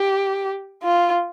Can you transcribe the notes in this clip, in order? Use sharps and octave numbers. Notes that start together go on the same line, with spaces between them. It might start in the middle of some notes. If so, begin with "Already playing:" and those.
Already playing: G4
F4